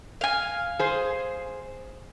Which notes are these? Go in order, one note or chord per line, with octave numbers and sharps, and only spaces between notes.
F5 G#5
G#4 C5